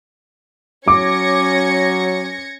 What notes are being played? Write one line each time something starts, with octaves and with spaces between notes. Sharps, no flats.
F#3 C#4 D6 G#6 A#6 C#7